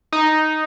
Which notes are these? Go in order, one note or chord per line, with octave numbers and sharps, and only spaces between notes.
D#4